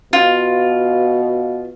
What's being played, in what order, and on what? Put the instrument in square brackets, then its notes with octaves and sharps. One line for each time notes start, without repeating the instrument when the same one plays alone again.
[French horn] B2 [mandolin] F4